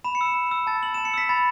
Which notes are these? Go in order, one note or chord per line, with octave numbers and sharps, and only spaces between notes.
B5 E7
C#7
E6 E7
B5
E6
A5 A6
E6 F#7
A5 E7
C#7
E6 B6
B5 A6